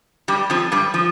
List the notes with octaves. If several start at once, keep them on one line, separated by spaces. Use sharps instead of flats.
G2 G3
F2 F3
G2 G3
F3